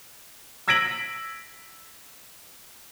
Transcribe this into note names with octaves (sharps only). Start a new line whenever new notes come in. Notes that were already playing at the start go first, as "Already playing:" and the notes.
E6 G#6 A#6 B6 D7 F#7